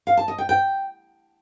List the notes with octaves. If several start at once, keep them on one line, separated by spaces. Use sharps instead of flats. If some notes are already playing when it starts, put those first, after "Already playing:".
F5
A5
D#5
G5
G5